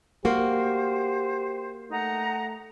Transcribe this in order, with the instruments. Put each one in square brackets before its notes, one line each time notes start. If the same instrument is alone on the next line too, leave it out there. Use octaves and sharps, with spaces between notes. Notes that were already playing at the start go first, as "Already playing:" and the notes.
[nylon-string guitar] A#3 F#4 [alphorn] G4 [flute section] C5
[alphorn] A3 [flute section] D#4 F#5 A#5